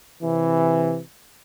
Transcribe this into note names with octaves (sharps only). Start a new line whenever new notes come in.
C3 E3